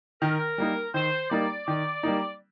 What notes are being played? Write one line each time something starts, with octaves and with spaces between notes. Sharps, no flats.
D#3 A#4
G3 A#3 D#4
D#3 C5
G3 A#3 D#4 D5
D#3 D5
G3 A#3 D#4